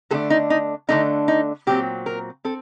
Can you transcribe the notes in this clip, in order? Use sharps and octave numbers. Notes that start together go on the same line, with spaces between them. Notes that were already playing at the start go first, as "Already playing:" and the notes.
D3 A3 D4 A4
D#4
D#4
D3 A3 D4 D#4
D#4
A#2 F#3 C4 G4
A#4
C4 A4